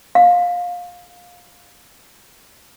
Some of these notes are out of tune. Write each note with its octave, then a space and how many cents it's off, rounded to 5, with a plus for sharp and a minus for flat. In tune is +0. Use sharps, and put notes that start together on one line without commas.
F5 +20